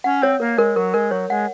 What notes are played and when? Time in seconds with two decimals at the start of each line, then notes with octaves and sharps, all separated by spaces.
0.04 C#4 F#5
0.22 C4 C#5
0.40 A#3 A#4
0.58 G#3 A#4
0.76 F#3 A#4
0.94 G#3 A#4
1.11 F#3 C#5
1.30 G#3 F#5